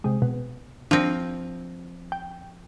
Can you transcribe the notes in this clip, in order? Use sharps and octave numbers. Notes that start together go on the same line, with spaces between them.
C3 G#3
B2
F3 C4 D4 A#6
G5